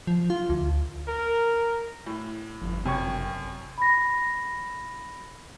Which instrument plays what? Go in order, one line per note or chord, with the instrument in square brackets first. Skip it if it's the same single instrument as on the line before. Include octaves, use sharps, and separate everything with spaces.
[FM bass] F3
F4
D2
[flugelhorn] A#4
[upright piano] A2
[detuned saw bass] G1 [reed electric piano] F2
[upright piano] F#2 G#6 [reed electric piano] C3 G5 C#6
[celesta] B5 A#6